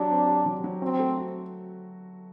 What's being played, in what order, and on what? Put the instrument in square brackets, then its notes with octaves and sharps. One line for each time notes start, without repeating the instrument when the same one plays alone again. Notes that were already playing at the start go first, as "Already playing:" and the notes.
Already playing: [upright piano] F#3 G4 [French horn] D4
[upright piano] C4
G4
F#3
F#3
[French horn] C4 [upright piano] F#4
[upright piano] A3
F#4